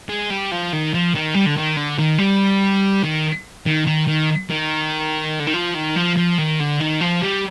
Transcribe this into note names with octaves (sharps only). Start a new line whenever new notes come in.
G#3
G3
F3
D#3
F3
D#3
G3
D3
D#3
D3
D#3
G3
D#3
D#3
D#3
D#3
D#3
D3
D#3
F3
D#3
F3
F3
D#3
D3
D#3
F3
G3